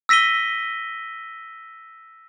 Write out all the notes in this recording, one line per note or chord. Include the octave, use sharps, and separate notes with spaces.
E6 A#6 B6 D#7 G7